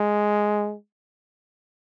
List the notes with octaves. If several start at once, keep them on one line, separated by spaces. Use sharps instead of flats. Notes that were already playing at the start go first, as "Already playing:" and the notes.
Already playing: G#3